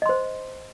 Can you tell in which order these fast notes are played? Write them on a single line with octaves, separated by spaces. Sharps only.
D#5 C6 C5